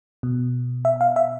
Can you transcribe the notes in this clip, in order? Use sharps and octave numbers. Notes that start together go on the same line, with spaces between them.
B2
E5
F5
E5